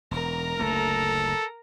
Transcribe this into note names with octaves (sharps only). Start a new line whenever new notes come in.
E1 A#4 A#5
F#1 D2 A3 A4